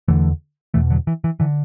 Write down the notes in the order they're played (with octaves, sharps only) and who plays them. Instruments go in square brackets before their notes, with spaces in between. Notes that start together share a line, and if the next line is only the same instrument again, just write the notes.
[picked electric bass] E2 D3 E3 A3
E2 B2 E3 A3
D3 F#3
E3
E3
D3 E3